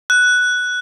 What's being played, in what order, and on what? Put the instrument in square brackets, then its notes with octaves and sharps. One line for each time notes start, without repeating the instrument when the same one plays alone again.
[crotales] F#6